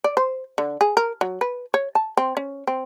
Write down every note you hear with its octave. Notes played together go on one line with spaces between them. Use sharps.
D5
C5
D3
G#4
A#4
F#3
B4
C#5
A5
C4
C#4
C4